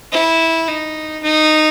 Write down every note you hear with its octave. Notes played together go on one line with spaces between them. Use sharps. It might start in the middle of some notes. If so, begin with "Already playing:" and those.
E4
D#4
D#4